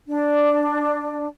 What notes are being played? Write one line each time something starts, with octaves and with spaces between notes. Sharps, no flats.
D4